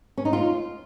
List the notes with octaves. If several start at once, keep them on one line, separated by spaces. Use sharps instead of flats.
C#4
D#4
F4